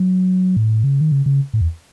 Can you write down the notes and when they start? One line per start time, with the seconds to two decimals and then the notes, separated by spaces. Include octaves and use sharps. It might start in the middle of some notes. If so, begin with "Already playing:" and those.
Already playing: F#3
0.57 A2
0.84 C#3
1.01 D#3
1.12 C#3
1.26 C#3
1.54 A2
1.61 E2